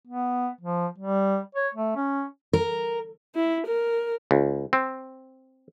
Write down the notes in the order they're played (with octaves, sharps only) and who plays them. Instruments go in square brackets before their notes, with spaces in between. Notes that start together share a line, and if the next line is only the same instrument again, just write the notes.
[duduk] B3
F3
G3
C#5
A3
C#4
[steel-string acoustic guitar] A#4
[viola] E4
A#4
[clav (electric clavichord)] C#2
C4